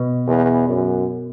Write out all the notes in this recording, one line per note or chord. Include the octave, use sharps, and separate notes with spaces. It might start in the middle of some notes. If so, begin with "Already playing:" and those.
Already playing: B2
E2
F#2